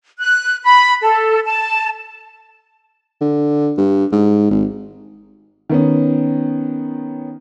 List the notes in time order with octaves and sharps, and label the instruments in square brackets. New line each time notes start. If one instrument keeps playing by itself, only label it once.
[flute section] F#6
B5
A4
A5
[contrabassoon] D3
G2
G#2
G#1
[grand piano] D#3 B3 C#4